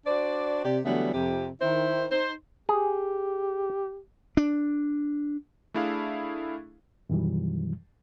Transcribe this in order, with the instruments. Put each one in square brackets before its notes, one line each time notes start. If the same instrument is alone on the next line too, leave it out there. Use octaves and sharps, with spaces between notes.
[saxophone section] D4 F#4 C5 D5
C3 G4 D5
D3 E3 F#3 G3 A3 B3
F2 C3 G4
D#3 E4 C5
D#4 C5
[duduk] G4 [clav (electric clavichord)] G#4
[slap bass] D4
[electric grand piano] A3 D4 E4 G#4 F5
[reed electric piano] F#2 B2 D#3 E3 F#3 G3